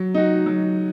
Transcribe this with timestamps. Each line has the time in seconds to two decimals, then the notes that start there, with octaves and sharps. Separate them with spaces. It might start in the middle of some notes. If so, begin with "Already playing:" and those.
Already playing: F#3
0.14 D#4 F#4
0.46 F#3